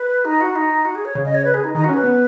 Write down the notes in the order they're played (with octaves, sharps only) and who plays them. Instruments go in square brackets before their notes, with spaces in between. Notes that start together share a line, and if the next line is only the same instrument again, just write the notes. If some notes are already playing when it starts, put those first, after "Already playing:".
Already playing: [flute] B4
D#4
F#4
D#4
F#4
G#4
C#5
[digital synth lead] C#3
[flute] D#5
C#5
B4
G#4
D#4
[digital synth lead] D#3 [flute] D#4
[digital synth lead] C#4 [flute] F#4
[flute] B4
[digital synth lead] B3